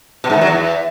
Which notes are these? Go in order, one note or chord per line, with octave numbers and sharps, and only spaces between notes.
B2
G#2
D#3
F#3
E2